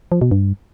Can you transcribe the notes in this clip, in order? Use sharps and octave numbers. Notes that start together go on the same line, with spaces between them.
F3
B2
G2